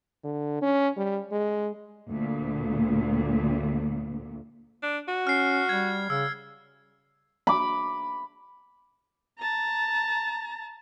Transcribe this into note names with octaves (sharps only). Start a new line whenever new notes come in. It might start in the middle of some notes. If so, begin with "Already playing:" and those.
D3
C#4
G3
G#3
D2 A#2
D4
F#4
C#4 F6 C7
G3 G#6
C#3 E6
B5 D6
A5 A#5